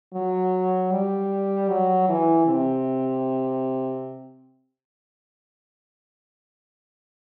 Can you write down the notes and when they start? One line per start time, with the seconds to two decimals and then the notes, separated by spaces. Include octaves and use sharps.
0.14 F#3
0.92 G3
1.69 F#3
2.09 E3
2.47 C3